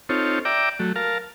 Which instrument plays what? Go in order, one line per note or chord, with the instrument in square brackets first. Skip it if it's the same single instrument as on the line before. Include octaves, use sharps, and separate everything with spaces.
[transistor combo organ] C4 D#4 F4 A4 C#5
D5 E5 G5 A#5 D6
F#3 A3
A#4 F5 A5